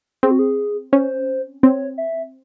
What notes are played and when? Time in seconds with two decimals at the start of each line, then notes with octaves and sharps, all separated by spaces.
0.23 C4 G#4
0.31 F#4
0.39 G#4
0.92 C#4 C5
1.63 C4 C#5
1.98 E5